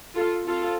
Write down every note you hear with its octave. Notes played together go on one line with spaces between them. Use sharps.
F4 A4
C4 F4 A4